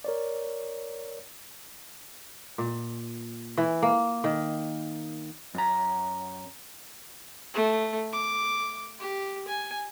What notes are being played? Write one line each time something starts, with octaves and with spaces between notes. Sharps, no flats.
A#4 C#5 D5
A#2
E3
A#3
D#3
F#2 A#5
A3
D6
G4
G#5